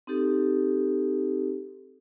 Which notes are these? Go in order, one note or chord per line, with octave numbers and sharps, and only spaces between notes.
C4 D#4 G4 A4